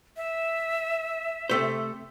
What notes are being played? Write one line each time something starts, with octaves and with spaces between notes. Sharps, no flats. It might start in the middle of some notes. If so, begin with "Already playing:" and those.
E5
C3 A3 C5